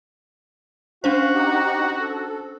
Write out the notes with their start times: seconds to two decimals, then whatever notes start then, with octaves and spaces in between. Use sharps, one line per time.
1.04 C#4 D4 F#4 C5 F5
1.34 D#4 G4 F#5
2.00 A4